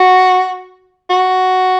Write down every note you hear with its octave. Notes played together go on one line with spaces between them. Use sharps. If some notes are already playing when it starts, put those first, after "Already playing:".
Already playing: F#4
F#4